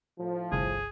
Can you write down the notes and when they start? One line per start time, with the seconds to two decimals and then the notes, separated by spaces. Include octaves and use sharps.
0.19 A2 F3
0.52 G1 C2 G#4